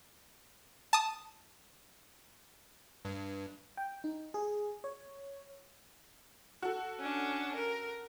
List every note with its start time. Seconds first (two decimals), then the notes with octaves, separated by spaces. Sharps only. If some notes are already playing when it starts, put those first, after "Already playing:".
0.93 A5 D#6
3.05 G2
3.77 G5
4.04 D#4
4.34 G#4
4.84 C#5
6.62 F#4 A4
7.00 C#4 D4
7.56 A#4